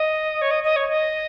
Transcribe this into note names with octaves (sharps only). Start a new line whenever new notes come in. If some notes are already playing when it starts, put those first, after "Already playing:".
Already playing: D#5
C#5
D#5
D#5
C#5
D#5